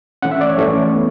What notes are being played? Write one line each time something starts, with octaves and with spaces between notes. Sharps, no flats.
E3 A3 C#4 F#5
E5
D5
C#5
E3 A3 C#4
B3